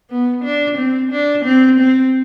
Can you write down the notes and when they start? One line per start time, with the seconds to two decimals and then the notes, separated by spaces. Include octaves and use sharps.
0.10 B3
0.44 D4
0.78 C4
1.11 D4
1.45 C4
1.79 C4